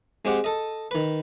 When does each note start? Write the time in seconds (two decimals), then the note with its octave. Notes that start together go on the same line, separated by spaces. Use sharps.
0.25 G#3 C4 G4 F#5
0.44 A4 D#5
0.91 D#3 B4